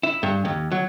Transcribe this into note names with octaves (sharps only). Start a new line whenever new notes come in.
E4
G2
D#2
F#3